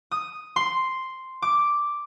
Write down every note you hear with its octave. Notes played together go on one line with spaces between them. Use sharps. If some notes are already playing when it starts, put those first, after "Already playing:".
D#6
C6
D6